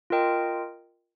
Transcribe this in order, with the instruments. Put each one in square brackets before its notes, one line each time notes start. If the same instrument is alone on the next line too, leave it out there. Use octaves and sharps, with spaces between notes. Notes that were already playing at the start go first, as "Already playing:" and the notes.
[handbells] F4 A#4 D#5 G5